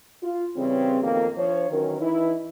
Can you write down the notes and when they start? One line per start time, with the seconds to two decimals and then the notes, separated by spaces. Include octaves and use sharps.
0.22 F4
0.56 C#3 E3 G3 C4
1.01 F2 B2 D#3 A#3
1.37 F3 D4 C5 C#5
1.70 D#3 E3 F#3 C#4 A#4
2.00 E3 D#4 E4